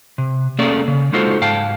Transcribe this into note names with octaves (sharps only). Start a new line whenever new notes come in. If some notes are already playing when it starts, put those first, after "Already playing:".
C3
A3 A#3 C#4 G#4 A4 D5
C#3
G#3 D#4 F4 F#4 A4 C5
G#2 F5 G5 A5